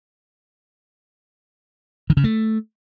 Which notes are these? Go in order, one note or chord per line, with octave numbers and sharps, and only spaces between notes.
D#3
C#3
A3